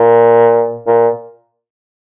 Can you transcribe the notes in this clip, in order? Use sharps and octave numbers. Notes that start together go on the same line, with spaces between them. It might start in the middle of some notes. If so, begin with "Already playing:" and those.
Already playing: A#2
A#2